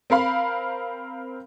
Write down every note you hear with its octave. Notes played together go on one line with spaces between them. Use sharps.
C4 A#4 F5 B5